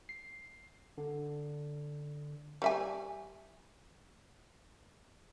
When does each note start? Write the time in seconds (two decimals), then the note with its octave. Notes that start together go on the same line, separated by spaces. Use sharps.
0.09 C7
0.98 D3
2.62 G3 E5 G#5